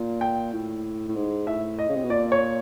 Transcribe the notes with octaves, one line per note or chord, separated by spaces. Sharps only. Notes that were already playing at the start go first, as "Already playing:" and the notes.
Already playing: A#2
G5
A2
A2
G#2
A2 E5
D#5
C#3
C3
B2
A#2 D5
C#5